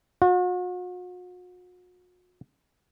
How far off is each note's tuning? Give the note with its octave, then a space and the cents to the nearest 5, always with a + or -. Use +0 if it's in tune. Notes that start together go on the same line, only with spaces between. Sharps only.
F#4 -45